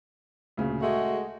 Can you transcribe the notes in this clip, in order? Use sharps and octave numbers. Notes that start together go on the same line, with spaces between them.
D2 A#2 C#3
G#3 A3 F#4 G#4